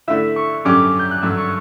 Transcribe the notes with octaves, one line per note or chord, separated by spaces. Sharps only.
D3 A3 E4 E5
C#6
F#2 D3 F#3 C#4 G4 D6
G6
F#6
G2 D3 F#3 E6
C#6